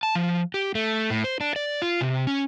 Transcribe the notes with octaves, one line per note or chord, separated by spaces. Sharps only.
A5
F3
G4
A3
A2
C5
D4
D5
F4
C3
C#4